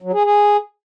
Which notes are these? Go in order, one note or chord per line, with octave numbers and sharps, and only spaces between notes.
F#3
G#4
G#4